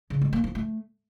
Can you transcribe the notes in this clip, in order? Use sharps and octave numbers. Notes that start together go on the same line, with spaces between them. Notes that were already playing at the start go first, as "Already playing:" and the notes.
C#3
G#3
A#3
F3
A3